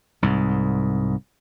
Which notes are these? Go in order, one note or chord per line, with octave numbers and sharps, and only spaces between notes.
C2 G#2